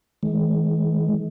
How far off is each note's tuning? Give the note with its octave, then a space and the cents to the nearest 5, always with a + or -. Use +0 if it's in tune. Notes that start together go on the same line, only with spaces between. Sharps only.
E3 -45 G#3 +30